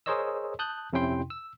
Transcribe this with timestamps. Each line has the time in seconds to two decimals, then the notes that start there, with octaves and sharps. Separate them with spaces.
0.06 G#4 A#4 C5 C#5 D#5 E6
0.59 A5 D#6 F#6 G6
0.93 F2 C3 C#4 E4 G5 C6
1.30 E6